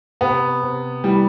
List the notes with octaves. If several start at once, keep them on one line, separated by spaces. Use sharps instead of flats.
C3 B3
C3
E3 G3